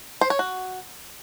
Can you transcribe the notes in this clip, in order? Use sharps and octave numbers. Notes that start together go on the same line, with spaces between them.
C5
C#5
F#4